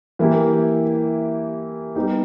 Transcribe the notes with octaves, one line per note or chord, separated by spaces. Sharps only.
E3 A#3 E4 G4
G3 B3 D#4 G4